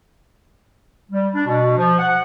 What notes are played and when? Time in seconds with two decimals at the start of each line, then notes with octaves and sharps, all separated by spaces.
1.11 G3
1.35 D4
1.46 B2
1.77 F3
1.99 F#5